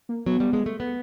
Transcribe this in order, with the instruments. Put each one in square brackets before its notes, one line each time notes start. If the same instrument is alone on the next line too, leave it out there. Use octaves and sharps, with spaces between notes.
[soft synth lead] A#3
[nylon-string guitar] F#3 [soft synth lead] B3
[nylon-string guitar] G3
G#3
A3
B3